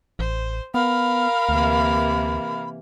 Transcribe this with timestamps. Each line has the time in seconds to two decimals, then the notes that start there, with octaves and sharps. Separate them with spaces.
0.19 A1 C5
0.74 B3 A#4 F5 B5
1.49 D2 C3 E3 A#3